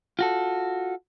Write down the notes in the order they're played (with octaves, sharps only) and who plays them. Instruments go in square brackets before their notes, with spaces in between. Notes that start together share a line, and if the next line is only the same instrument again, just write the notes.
[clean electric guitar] F4 F#4 A4